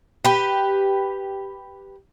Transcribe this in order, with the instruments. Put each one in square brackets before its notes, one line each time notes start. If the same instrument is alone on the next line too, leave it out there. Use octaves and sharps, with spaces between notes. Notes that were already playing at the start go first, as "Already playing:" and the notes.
[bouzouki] G4 B4